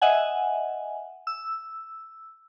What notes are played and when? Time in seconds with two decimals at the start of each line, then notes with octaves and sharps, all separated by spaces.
0.02 D#5 E5 F#5 G#5
1.27 E6